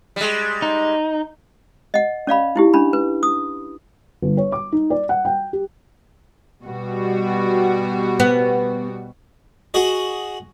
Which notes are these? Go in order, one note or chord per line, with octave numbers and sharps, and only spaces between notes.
G3 G#3
D#4
D#5 F#5
C#4 D5 F5 B5
D#4 E4 G4
C#4 D4 B5
B4
D#6
G1
C#5
D6
D#4
D5
F#5
G5
G4
B2 G3 F#4
B3
F#4 G#4 D#5